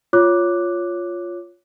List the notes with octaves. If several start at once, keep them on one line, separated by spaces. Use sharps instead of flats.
F4 C#5 D6 F#6